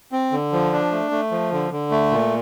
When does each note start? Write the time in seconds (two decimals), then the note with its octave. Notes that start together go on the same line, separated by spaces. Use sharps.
0.12 C4
0.32 D3
0.53 F3
0.72 D4
0.91 A3
1.11 A3
1.31 F3
1.52 D3
1.71 D3
1.91 A3
2.11 A#2